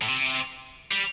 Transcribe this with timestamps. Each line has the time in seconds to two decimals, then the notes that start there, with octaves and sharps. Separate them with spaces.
0.02 A2
0.08 C3
0.92 G3